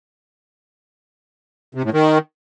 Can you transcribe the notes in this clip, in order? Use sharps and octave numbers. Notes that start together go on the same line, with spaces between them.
C3
A2
D#3